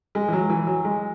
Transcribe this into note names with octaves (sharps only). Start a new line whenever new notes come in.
G#3
E3
F#3
E3
F#3
G#3